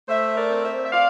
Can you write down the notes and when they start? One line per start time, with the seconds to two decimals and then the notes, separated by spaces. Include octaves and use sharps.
0.08 A3 C5 E5
0.36 A#4 D5
0.50 C4
0.64 C5 E5
0.85 E5
0.91 C4 D5 F5